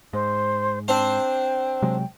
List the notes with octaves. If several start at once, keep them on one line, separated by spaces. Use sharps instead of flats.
G#2 C5
C4 D4 C5 G5
C3 F#3 G#3